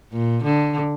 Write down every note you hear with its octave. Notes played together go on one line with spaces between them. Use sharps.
A#2
D3